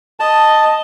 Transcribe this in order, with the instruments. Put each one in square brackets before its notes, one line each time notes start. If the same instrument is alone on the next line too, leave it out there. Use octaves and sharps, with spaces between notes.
[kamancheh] D#5 [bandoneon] A5